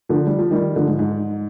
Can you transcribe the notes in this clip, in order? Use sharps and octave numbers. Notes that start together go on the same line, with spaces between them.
D3 F3
G3
F3
D#3 G3
D3 F3
G#2
G#2